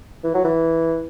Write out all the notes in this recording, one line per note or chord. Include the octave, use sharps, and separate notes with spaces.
E3
F#3
E3